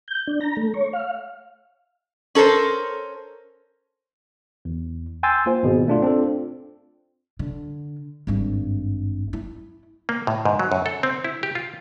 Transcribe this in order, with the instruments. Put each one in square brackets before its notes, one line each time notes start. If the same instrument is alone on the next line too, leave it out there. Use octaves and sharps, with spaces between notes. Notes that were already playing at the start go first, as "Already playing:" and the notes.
[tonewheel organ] G6
D4
A#5
A3
C#5
F5
[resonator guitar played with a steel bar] C#4 A4 A#4 C5
[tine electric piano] E2
G5 G#5 C6 E6 G6 A6
A#3 F4 C5
G#1 B2 G#4
A3 D4 F4
C4 D4 F4 A4
[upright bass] D3
G#1 G2
E4
[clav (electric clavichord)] A#3
A2
G#2
F#3
F#2
A4
C4
E4
G4
F4